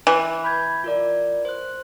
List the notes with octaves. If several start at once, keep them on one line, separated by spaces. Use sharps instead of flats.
E3
B5 G6 G#6
F4 A#4 D5
C5 F#6